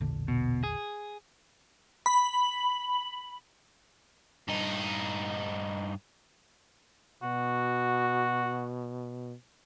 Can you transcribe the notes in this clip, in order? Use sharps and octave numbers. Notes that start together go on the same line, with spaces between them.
E1 A#1 D3
B2
G#4
B5
G2 D#4
B2 F#4